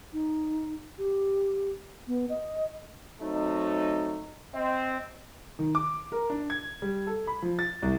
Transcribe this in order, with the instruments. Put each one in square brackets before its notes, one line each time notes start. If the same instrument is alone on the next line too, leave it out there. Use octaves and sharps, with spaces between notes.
[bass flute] D#4
G4
B3
D#5
[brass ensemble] F#3 A3 C4 D#4
C4 D#5
[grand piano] D#3
D6
A#4
D4
G#6
G3
A4
B5
F3
A6
C2